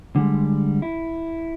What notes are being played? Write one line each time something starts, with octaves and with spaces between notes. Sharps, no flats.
D3 G3 G#3
E4